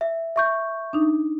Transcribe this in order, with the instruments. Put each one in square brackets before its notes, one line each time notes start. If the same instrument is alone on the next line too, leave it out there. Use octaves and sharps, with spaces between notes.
[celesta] E5
E5 C#6 G6
[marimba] D4 D#4